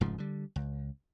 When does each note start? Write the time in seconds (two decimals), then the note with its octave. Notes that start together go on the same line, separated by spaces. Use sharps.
0.01 F1 G#2 C#3 F3
0.18 D3 G3
0.56 C#2